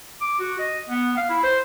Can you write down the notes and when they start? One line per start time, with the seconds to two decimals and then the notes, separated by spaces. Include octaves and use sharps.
0.21 D6
0.40 F#4
0.59 D#5
0.89 B3
1.17 F5
1.30 E4
1.43 C5